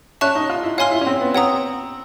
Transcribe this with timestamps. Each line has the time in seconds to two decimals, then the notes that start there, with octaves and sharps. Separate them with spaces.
0.21 C#4 E5 A5 C#6 F#6
0.35 D#4
0.49 F4
0.63 E4
0.78 F4 C#5 F5 G#5 C6 F6
0.91 E4
1.01 C#4
1.07 C4
1.21 B3
1.35 C4 C#5 F#5 A#5 D#6